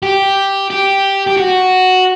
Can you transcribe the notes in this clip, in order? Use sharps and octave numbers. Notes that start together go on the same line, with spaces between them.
G4
G4
G4
F#4